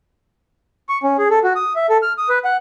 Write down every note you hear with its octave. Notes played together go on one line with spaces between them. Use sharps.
C#6
C#4
G#4
A4
F#4
D#6
E5
A4
F6
D#6
B4
F#5